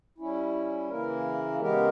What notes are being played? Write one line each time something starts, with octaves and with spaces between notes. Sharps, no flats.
G3 C#4 E4
C#3 E3 A#3 E4 A#4
C#3 G#3 B3 G4 A#4